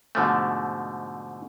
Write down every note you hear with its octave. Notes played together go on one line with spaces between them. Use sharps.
G#2 B2 D3 F3 G#3 A3